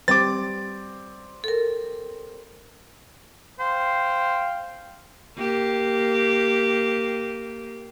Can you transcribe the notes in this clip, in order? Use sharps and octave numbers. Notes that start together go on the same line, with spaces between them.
G3 C4 D6 A6
A4 A#4
C5 F5 G5
A#3 G4